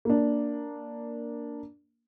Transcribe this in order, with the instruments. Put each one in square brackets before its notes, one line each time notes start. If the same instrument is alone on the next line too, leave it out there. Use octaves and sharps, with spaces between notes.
[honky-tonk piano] A#3 D4